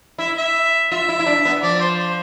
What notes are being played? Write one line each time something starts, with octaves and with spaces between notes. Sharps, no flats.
E4 E5
E5
F4 E5
E4
E4
D4
B3
F3 D5
C5
C5